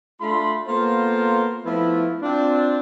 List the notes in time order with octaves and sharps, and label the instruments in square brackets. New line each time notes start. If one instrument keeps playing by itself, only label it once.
[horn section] A3 D4 F4 A4 B5 C6
A#3 B3 F4 A4 A#4 C5
F3 A3 B3 E4
C4 D4 F4